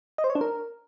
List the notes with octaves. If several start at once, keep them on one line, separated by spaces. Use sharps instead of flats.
D#5
C5
C#5
D4
A#4